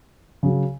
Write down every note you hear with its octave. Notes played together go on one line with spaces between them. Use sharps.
C#3 F#3 C#4